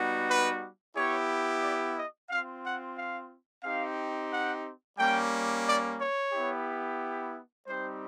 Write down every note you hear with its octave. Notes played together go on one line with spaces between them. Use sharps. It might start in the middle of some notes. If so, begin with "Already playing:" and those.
Already playing: G3 B3 D#4 F#4
B4
B3 E4 G4 C#5
D5
D#5
C4 F4 F5
F#5
F5
C4 D#4 G4 F5
F#5
G3 A#3 C#4 G5
D5
C#5
B3 E4 G4
G3 C4 D#4 G4 C5